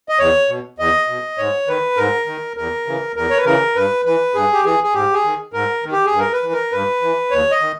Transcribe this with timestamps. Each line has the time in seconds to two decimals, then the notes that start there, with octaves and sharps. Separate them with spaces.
0.09 D#5
0.19 E2 C#5
0.49 B2
0.79 E2 D#5
1.08 B2
1.38 G#2 C#5
1.67 D#3 B4
1.97 G#2 A#4
2.27 D#3
2.57 E2 A#4
2.86 C#3 E3
3.16 E2 A#4
3.30 C#5
3.37 B4
3.45 C#3 E3 A#4
3.76 G2 B4
4.05 E3 B4
4.34 G2 G#4
4.53 G4
4.64 E3 G#4
4.84 G#4
4.94 G#2 G4
5.13 G#4
5.24 D#3
5.53 G#2 A#4
5.84 D#3
5.92 G4
6.06 G#4
6.12 G2
6.19 A#4
6.33 B4
6.43 E3
6.53 A#4
6.72 G2 B4
7.02 E3
7.31 D#2 C#5
7.51 D#5
7.61 D#3